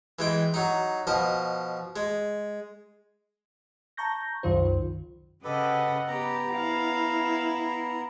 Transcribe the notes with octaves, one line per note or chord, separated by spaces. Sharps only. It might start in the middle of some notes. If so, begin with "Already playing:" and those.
E3 G#3 G5
F#3 D#4
B2 F3 D#5
G#3
A5 A#5 C#6 G6 A#6
C2 F#2 D#3 F4 C5
C#3 G4 A4 B4 D#5 F#5
B3 G4 A#5
E4 F5